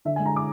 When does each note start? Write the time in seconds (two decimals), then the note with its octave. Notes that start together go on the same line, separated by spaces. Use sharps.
0.05 D3 E5
0.16 G#5
0.19 G#3
0.26 A#5
0.36 D6